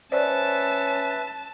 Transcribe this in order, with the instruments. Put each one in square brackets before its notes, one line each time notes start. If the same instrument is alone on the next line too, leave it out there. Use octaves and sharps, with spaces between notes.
[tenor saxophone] C#4 [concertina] B4 E5 [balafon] C5 D5 [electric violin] A5